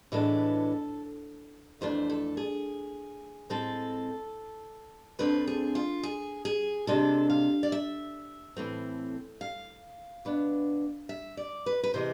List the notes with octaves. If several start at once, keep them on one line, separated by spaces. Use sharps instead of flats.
A2 E3 G#3 B3 D4 A4
F2 E3 A3 D4 C5
A4
G#4
A2 G#3 C4 A4
D2 D3 A3 C4 B4
G#4
F4
G#4
G#4
C3 G#3 D4 A4
F5
D5
E5
A2 E3 A3 C4
F5
B2 B3 D4
E5
D5
B4
B4
C3 E3 G#3 C5